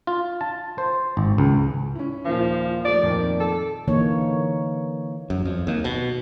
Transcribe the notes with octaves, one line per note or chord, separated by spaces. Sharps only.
F4
A5
C5
G#1
C#2
C#4 E4
D#2 A#2 F3
F3 A3 D5
F2 A#2 D#3
A4
D3 E3 A#3 D#4 C#5
F#2
F2
D#2
B2